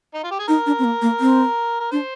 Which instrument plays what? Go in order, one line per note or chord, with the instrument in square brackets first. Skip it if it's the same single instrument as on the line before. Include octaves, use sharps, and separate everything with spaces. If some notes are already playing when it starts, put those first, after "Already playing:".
[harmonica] D#4
F4
G4
G#4
[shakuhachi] D#4 [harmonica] A#4
[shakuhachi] D4
C4
A#3
A#3
C4
[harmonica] A#4
[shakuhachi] D4 [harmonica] C5